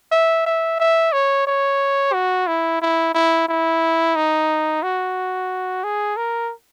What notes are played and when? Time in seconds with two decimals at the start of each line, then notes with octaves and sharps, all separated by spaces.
0.12 E5
0.46 E5
0.80 E5
1.13 C#5
1.47 C#5
2.13 F#4
2.47 E4
2.82 E4
3.15 E4
3.48 E4
4.16 D#4
4.83 F#4
5.84 G#4
6.17 A#4